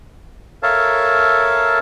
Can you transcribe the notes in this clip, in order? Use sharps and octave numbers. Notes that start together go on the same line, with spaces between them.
A4 A#4 C#5 E5 F5 A5